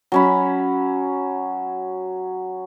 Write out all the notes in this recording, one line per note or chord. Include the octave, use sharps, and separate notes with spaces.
F#3 C#4 B5